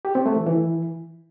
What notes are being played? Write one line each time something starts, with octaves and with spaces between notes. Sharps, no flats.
G4
C4
A3
E3
E3